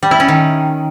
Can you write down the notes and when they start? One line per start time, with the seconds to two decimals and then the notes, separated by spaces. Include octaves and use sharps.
0.03 G3
0.11 E4
0.20 C#4
0.28 D#3